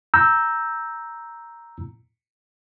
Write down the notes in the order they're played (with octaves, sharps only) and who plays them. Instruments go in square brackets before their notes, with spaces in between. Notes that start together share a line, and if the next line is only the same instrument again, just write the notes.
[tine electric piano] A#5 E6 G6